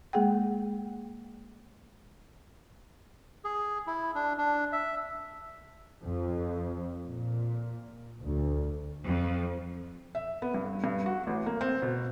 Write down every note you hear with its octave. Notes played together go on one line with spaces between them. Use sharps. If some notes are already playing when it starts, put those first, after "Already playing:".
G#3 A#3 G#4 F#5 G5
G#4
E4
D4
D4
E5
F2
A#2
D2
F2
E5
B3
G2
G2
F#4
A1
A#3
C4
B2